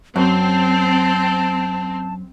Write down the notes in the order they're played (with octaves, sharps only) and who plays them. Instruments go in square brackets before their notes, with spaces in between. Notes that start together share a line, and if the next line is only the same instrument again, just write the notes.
[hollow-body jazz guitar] F#2 [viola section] C4 [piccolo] A5